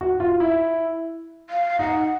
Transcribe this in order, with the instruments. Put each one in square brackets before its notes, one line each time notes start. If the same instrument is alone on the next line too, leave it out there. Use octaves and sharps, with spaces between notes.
[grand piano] F#4
F4
E4
[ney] F5
[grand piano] D#4 [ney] F#5